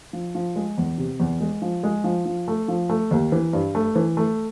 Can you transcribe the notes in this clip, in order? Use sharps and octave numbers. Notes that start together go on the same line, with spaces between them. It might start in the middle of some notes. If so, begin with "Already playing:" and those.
F3
F3
G#3
E2
C3
E2
G#3
F3
G#3
F3
F3
A3
F3
A3
D#2
E3
G2
A3
E3
A3